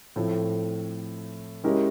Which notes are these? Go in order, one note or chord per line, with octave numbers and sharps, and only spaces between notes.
A2 F3 A3 C4
G#3 C#4 E4 G4 A#4